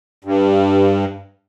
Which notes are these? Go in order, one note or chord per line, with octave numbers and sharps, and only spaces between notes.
G2